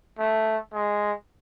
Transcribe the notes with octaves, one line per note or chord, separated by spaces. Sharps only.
A3
G#3